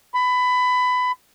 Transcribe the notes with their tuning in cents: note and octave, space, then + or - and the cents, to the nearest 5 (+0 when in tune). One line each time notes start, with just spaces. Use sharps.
B5 +20